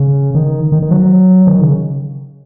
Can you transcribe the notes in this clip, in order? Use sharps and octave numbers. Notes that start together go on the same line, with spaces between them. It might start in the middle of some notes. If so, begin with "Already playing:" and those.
Already playing: C#3
D#3
D#3
D#3
F#3
D#3
C#3